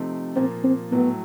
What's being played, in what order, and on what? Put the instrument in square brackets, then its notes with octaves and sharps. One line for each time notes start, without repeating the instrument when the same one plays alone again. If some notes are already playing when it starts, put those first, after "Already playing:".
Already playing: [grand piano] C3 F3 A3 C4 D#4
[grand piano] A#2 F3 A#3 [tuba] C4
[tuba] C4
[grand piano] A2 F#3 A3 [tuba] B3